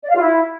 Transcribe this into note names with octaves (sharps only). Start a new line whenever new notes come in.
D5
F5
F4
E4